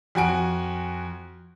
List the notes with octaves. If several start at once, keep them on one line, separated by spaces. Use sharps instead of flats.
F2 F#4 G#5 D7